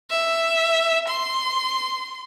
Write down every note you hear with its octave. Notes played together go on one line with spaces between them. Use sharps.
E5
C6